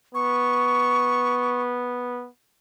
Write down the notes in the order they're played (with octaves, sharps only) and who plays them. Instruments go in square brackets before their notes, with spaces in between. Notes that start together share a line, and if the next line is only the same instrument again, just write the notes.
[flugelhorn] B3 [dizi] C#6